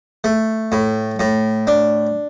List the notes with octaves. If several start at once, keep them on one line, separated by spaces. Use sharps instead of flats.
A3
A2
A2
D4